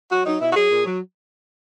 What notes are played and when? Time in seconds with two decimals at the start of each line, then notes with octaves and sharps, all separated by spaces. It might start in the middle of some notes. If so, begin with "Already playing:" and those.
0.12 F#3 F#4
0.26 F#3 D#4
0.41 B2 E4
0.51 F#4
0.55 F#3 G#4
0.70 A#2
0.85 F#3